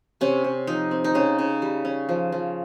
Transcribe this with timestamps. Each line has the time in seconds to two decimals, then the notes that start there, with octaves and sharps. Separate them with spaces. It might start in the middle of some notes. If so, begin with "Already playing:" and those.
0.21 C3 C#4
0.44 C3
0.67 F3 D#4
0.91 C4
1.04 D#4
1.14 C#3 C#4
1.39 C#3
1.62 G3
1.85 C#4
2.09 F3
2.32 F3